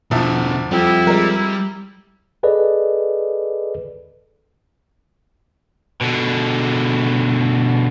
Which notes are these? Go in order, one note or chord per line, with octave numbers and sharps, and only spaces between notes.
E2 B2 D3 F3 E5
F2 G3 E4 G4
G3 G#3 A#4
G#4 A4 B4 D5 D#5
B2 D3